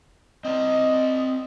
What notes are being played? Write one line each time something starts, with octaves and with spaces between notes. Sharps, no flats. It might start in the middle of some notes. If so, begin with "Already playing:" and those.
C4 C5 D5 D#5